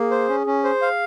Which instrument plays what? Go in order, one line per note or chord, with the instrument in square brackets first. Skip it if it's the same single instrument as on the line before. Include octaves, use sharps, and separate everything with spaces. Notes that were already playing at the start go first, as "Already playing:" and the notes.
Already playing: [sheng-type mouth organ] A#3 [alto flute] G#4
[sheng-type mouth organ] C5
C#4
C#4
C5
F5